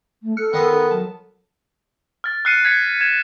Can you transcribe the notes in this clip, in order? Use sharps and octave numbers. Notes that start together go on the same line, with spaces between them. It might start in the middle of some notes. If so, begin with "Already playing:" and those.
A3
A4 F6 F#6 C#7
D#3 B3 D#5 C6
D#4 A4
F#3 A5
F6 A6
F6 F#6 C7 C#7 D#7
G#6 B6 C#7
G#6 E7